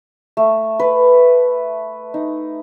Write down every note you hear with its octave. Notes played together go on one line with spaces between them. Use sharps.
A3
B4
D#4